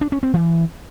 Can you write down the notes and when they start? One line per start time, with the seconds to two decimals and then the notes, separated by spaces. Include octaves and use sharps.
0.01 D4
0.12 C#4
0.23 C4
0.34 E3